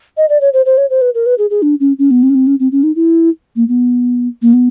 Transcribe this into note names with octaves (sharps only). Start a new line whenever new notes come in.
D#5
D5
C#5
C5
C5
C#5
C5
B4
A#4
B4
G#4
G#4
D4
C#4
C#4
B3
C4
C#4
C4
C#4
C4
C#4
D#4
E4
A#3
B3
A#3
B3